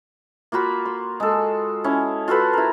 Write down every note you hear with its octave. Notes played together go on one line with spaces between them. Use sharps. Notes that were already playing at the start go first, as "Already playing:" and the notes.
A#3 F4 F#4 B5
C6
G#3 A4
C#4 E4
F4 F#4 A4 B4
E4 A#4